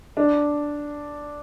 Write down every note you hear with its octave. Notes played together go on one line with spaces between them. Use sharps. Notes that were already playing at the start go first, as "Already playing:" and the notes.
D4